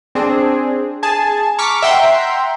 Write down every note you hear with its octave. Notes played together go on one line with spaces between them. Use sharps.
C4 D4 G#4
G#4 G#5 A5
A#5 C#6 D6 F6 B6
E5 F#5 G5 A#5 C6